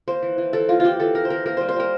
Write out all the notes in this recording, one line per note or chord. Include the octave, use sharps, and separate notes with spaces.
A#3 C5
E3
E3
E3 A4
A#3 F4
E3 F4 G4
E3 A4
A#3 A#4
C5
E3 A#4
A#3 A#4
G3 C5
C5
G3 A#4